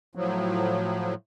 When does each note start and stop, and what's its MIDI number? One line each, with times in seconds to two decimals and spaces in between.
0.15 1.14 45
0.15 1.14 53
0.15 1.14 54